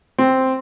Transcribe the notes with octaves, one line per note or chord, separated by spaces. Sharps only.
C4